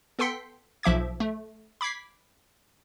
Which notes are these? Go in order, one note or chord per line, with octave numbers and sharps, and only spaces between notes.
B3 A4 G5 C6 B6 C#7
B1 F3 E5 D6 G#6
A3
B5 D6 G#6 B6 C7